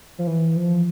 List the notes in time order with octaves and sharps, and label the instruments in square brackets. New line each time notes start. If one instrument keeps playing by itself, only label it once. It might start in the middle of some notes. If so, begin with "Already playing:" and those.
[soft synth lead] F3
E3
F3